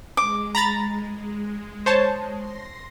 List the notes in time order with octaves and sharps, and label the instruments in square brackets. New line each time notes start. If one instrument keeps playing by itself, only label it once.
[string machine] G#3 [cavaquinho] D6
[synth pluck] A#5 B5 A6
C5 C#5 A5
[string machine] C6 A#6